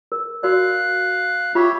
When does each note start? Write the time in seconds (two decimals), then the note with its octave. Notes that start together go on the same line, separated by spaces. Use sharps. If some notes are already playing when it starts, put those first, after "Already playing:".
0.12 A#4
0.43 F#4 A#4 D5 F5 F#6
1.55 F4 G4 C#5 E5 B5 C#6